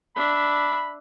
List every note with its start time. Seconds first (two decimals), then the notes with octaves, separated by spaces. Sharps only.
0.16 D4 E5 B5